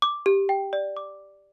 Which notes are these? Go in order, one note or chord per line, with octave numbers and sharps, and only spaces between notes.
D6
G4
G5
D5
D6